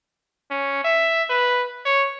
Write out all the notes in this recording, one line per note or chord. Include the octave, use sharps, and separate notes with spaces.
C#4
E5
B4
C#5